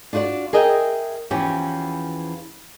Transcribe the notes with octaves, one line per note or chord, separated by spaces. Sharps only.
D4 F4 F#4 C5 D5
G#4 A#4 D#5 E5 F#5 G5
E2 E3 F3 C#4 G4